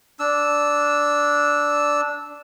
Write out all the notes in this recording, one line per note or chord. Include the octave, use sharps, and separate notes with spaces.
D4 E6